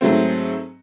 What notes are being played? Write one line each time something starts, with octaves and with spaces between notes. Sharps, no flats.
G#2 F#3 A3 C4